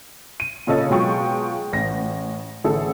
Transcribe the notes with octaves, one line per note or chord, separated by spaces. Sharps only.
D#7
A#2 C#3 C#4 A4 D#5 A6
B2 F#3 G#3 F4 G5 C#6
A1 A#6
A1 D3 E4 G#4 A4